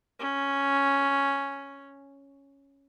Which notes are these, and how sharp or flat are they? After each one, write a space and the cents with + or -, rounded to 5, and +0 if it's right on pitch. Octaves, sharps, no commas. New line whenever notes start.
C#4 +0